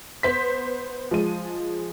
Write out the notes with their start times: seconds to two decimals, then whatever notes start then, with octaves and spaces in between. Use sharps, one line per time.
0.23 B3 C5 B6
1.11 F3 G#3 D#7